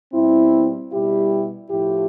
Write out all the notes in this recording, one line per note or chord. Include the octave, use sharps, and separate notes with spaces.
B2 G3 C4 E4
B2 G3 E4 G4
A2 F3 E4 G4